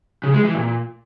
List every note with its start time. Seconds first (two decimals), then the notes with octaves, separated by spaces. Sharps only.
0.23 C#3
0.34 G#3
0.44 E3
0.54 A#2